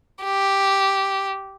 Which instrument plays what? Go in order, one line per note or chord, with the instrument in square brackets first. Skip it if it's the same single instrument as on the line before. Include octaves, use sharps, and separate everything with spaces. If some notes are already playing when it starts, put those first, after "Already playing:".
[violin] G4